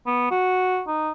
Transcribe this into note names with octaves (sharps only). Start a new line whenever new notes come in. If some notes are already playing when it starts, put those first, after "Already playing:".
B3
F#4
D#4